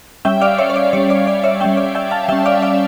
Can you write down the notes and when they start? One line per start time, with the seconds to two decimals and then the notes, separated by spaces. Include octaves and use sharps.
0.25 G3 C#4 E5 G5
0.41 D5 F5
0.58 C#5 E5
0.70 C#5
0.76 D5
0.93 G3 C#4 C#5
1.10 D5
1.27 D5
1.44 C#5 E5
1.60 G3 C#4 E5 G5
1.77 D5
1.95 E5 G5
2.11 F5 A5
2.28 G3 C#4 E5 G5
2.46 D5 F5
2.62 D5 F5